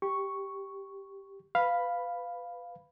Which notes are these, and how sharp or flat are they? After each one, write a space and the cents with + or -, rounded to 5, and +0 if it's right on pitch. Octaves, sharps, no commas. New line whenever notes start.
G4 +0 C#6 +0
B4 +20 F5 +0 B5 +0